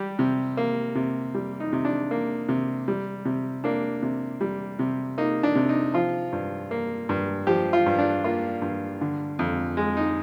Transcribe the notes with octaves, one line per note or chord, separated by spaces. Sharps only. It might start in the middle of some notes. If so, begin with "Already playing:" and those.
Already playing: G3 G4
C3
A#3
C3
G3
D#4
C3
D4
A#3
C3
G3
C3
A#3 D4
C3
G3
C3
A#3 D#4
D4
C3
D#4
F3 F4
G2
A#3
G2
F3 G4
F4
G2
D4
A#3 F4
G2
D3
F2
G#3
D#4